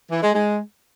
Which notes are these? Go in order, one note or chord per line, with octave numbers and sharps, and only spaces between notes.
E3
G#3
G#3